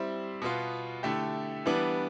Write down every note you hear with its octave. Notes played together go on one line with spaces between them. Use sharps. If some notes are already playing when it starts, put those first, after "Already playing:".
Already playing: G3 C4 E4
B2 B3 F4
D3 A3 E4 G4
E3 G3 B3 D4